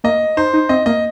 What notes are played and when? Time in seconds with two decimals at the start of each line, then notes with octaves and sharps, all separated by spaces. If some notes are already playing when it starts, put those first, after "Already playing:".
0.04 A#3 D#5
0.37 D#4 C5
0.53 D#4
0.69 C4 D#5
0.86 A#3 D#5